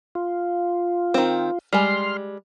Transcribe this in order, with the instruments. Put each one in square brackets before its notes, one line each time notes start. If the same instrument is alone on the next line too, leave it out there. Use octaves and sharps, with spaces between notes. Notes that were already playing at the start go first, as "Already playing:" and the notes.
[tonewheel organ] F4
[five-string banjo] D#3 C4
[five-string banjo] G3 G#3 [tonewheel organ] C6 F6